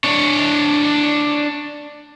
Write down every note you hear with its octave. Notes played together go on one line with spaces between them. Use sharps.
D4 C#5